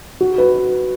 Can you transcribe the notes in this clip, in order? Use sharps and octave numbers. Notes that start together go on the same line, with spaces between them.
F#4
B4